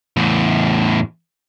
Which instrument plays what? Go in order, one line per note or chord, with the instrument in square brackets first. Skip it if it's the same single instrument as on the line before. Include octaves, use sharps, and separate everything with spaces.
[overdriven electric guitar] E2 A2